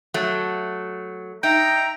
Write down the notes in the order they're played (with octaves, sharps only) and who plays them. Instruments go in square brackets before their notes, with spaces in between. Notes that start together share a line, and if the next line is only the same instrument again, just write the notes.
[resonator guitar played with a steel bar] F#3 A3
[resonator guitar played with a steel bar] D#4 [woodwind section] E5 A#5 [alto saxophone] G5